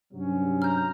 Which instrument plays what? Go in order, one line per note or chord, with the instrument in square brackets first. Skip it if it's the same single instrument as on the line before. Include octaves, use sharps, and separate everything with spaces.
[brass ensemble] G2 C3 F#3 [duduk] C#4
[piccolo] A#5 [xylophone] F6 G6